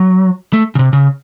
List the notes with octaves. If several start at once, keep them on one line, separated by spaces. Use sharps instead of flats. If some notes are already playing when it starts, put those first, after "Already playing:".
Already playing: F#3
A3
C#3
C3
C#3